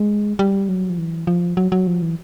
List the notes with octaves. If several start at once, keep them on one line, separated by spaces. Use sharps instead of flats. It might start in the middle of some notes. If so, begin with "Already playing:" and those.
Already playing: G#3
G3
F#3
F3
E3
F3
F#3
F#3
F3
E3